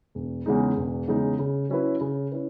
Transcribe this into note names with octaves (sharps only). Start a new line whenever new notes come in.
E1
E2 C#3 G#3 D#4
E1
E2 C#3 G#3 D#4
C#3
F#3 C#4 E4 B4
C#3
C#4 E4 B4